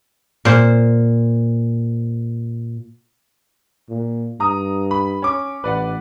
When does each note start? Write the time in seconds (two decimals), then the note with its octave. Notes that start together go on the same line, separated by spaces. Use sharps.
0.45 A#2 C5
3.90 A#2
4.40 G2 A#5 D#6
4.91 B5
5.22 C#4 D6
5.64 A1 B4 D5 F#5